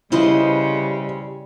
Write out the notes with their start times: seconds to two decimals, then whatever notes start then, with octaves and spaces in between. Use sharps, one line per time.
0.12 C#3 G3 E4 B4 C5 D#5